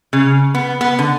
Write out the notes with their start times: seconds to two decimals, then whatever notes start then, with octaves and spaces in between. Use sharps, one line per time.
0.13 C#3
0.55 B3
0.81 B3
0.99 D3